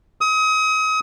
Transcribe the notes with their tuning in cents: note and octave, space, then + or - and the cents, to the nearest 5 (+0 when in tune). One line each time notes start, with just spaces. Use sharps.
D#6 +35